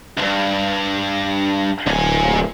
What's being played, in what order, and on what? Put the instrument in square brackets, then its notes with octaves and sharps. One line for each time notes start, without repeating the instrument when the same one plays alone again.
[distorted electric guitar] C#2 G2
[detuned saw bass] D1 [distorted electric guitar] A#2 G#5